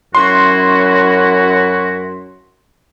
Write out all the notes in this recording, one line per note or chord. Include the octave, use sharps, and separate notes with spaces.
F#2 C#4 E4 F#4 C6